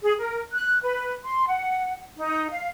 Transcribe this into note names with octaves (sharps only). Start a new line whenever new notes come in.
G#4
A#4
F#6
B4
C6
F#5
D#4
F5